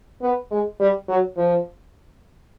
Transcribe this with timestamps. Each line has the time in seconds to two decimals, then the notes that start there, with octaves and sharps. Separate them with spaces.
0.22 B3
0.51 G#3
0.80 G3
1.08 F#3
1.37 F3